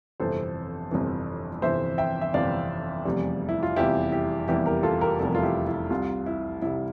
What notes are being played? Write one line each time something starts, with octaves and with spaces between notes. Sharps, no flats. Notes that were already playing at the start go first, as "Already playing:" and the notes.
G1 F2 C3 E3 A4 C5
G1 F2 C3 E3
G1 F2 C3 E3 C5 E5
E5 G5
E5
G1 F2 C3 E3 D5 F5
F1 E2 C3 E3 G3
E4
F4
F1 E2 C3 E3 G3 E4 G4
E4 G4
F1 E2 C3 E3 G3 E4 G4
G4 A#4
F4 A4
G4 A#4
F1 E2 C3 E3 G3 A4
A#4
F4 A4
E4 G4
E4
C2 C3 G3 F4
E4
C2 C3 G3 E4